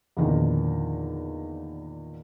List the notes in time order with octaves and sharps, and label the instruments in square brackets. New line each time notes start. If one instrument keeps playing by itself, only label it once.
[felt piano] E2 A#2 D3 D#3 F3